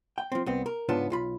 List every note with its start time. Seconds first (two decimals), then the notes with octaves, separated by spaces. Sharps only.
0.18 G5
0.32 F3 C4
0.46 C2 B3 C4
0.66 A#4
0.89 G#2 C#3 B3 D4 F4 A5
1.10 B1 F4 B5